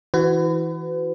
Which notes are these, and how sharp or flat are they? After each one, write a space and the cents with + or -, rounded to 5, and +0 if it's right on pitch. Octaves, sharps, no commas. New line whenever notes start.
E3 -20 F#4 +0 B4 +35